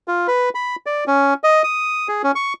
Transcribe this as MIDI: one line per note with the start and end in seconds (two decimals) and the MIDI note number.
0.08 0.27 65
0.28 0.49 71
0.55 0.76 83
0.86 1.04 74
1.07 1.34 61
1.44 1.62 75
1.64 2.08 87
2.08 2.22 68
2.24 2.32 61
2.35 2.53 85